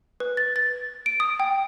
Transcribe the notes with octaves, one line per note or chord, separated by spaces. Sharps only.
B4
A6
A6
D7
D#6
G5